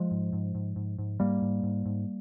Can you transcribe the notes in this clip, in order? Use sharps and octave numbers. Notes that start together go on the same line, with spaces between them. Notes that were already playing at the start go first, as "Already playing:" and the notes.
Already playing: F3 G#3
G#2
G#2
G#2
G#2
G#2
G#2 G3 A#3
G#2
G#2
G#2